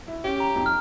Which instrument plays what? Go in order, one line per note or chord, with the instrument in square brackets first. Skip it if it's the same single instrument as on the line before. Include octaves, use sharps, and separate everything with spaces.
[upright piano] E4
[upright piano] C#4 [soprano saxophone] G4
[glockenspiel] A#5
[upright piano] F2 D#4
[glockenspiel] F6